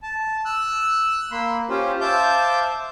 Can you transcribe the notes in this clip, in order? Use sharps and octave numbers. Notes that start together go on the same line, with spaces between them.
A5
E6 F#6
A#3 B5 C6
C#4 F4 G4 C5
C5 E5 F5 A5 D6 G6